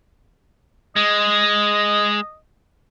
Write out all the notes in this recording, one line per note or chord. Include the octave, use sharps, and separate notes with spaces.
G#3 D#5